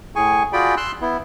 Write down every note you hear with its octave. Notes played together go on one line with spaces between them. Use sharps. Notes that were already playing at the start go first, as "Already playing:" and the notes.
A2 G#4 G#5 C#6
F4 F#4 G#4 D5 G5 B5
C6 E6 F#6
B3 E4